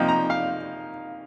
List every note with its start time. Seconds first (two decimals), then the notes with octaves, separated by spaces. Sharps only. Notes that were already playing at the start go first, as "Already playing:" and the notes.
Already playing: C3 F3 A#3 D#4 G5
0.08 A#5
0.30 F5